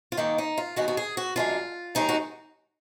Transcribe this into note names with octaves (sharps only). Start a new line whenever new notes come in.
F4
G#2 D#3 A#3 D#4
D#4
F4
D#2 D#3 G#3 B3 F#4
F#4
G#4
F#4
F#2 D3 G#3 F4
D#2 D#3 G#3 D#4
F#4